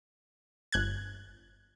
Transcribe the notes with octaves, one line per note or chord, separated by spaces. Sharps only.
G1 F#6 G#6